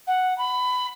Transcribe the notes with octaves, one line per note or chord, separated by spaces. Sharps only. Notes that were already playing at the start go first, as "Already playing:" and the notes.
F#5
B5